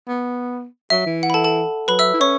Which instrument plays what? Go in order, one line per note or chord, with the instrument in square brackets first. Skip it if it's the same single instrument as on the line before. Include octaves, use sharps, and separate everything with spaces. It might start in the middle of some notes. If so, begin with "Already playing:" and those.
[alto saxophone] B3
[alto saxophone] F#3 [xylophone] E5
[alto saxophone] E3
[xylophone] F#5
B5
A4 A5
A4 A5
[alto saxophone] F#3 [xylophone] B4 B5
[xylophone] E5 E6
[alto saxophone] E4
[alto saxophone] C#4 [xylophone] C#5 C#6